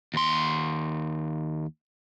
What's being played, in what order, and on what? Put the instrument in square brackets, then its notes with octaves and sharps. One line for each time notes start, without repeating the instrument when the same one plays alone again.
[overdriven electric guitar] D#2 C6